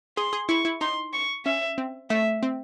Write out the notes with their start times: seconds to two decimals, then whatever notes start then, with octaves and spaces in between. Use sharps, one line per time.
0.17 G#4 C6
0.33 G#4
0.49 E4 C#6
0.65 E4
0.81 D#4 C6
1.14 C#6
1.46 C#4 E5
1.78 C4
2.10 A3 E5
2.43 C4